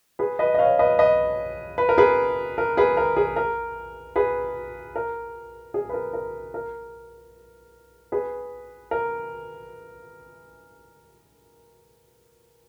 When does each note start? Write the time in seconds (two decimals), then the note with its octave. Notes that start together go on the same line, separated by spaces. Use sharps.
0.19 G#4 B4
0.39 B4 D#5
0.54 D#5
0.59 C#5 F5
0.79 B4 D#5
0.99 B4 D#5
1.78 B4
1.89 A#4
1.98 G#4 B4
2.58 A#4
2.77 G#4 B4
2.97 A#4
3.17 G#4
3.36 A#4
4.16 G#4 B4
4.96 A#4
5.74 G#4
5.89 B4
5.94 A#4
6.14 A#4
6.54 A#4
8.12 G#4 B4
8.91 A#4